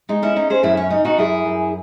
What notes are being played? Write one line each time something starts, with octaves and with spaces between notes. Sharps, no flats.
G#3 D#4
C#4 E4
C#4 D#4
G#4 C5
F#2 E4 G#4
C#4
C#3 D#4
D#4 F#4
F#2 E4 G#4
F#2